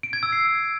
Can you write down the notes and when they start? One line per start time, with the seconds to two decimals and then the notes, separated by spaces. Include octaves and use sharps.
0.03 D7
0.13 G#6
0.23 E6
0.32 C7